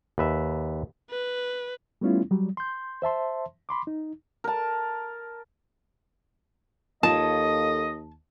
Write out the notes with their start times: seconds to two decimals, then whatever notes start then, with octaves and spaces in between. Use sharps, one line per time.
0.18 D#2 B4 E5
1.10 B4
2.01 G3 A3 B3 C#4 E4 F4
2.31 F#3 G3
2.57 C6 G6
3.02 C5 E5 A5 C6
3.69 B5 C6 D6
3.87 D#4
4.44 A#4 A5
7.03 D#2 F4 A4 C#5 D#5 A5